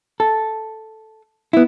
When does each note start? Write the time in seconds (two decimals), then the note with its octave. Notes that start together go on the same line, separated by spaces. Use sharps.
0.20 A4
1.53 B3 E4